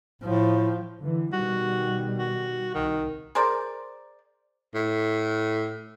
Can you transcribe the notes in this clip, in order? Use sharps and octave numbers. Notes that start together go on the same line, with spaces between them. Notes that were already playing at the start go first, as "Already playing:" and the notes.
A2 F3
D3 E3
B2 D#3 G3 F#4
F#4
C2 D#3
G#4 A#4 C5 D5
A2